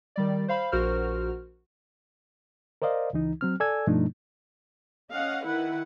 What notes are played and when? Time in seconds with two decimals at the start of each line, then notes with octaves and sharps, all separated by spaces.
0.16 D#3 G3 D5
0.48 C5 F5 B5
0.72 A#1 F#4 A#4 C5 F6
2.82 A#4 C5 D5 D#5 F5
3.13 C#2 E3 D#4
3.41 F#3 C4 F6
3.60 A4 D5 G#5 E6 G#6
3.87 G2 B2 F3 A3 D4 D#4
5.13 C#4 D#5 F5 F#5
5.46 D#3 E4 B4 F#5